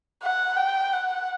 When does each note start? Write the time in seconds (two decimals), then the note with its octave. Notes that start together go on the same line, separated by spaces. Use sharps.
0.23 F#5
0.57 G5
0.93 F#5